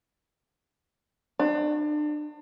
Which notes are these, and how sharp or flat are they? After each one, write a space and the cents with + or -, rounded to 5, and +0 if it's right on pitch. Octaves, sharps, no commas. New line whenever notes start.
D4 +35